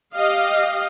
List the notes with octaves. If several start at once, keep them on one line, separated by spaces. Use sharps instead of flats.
G4 D#5 F5